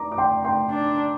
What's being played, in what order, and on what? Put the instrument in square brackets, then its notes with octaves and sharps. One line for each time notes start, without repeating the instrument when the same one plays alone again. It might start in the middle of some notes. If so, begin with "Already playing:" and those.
Already playing: [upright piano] A#5 D6
D6
G5 C6
G5 C6
[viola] D4